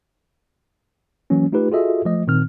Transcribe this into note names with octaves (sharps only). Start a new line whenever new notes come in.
E3 F#3 A#3 C#4
A3 D#4 F4 G4 B4
F4 F#4 G#4 A4 D#5 E5
F3 A3 D#5
A#2 D#3 C4 F6